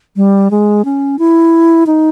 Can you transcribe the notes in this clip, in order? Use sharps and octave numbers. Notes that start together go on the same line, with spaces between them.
G3
G#3
C#4
E4
D#4